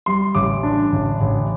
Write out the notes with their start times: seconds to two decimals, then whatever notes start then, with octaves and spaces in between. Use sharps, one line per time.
0.06 G3 C6
0.35 A1 D6
0.63 D4
0.92 A1
1.21 A1